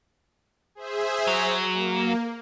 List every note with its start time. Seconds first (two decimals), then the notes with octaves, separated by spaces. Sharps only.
0.75 G#4 C5 E5
1.27 F#3
1.73 A#3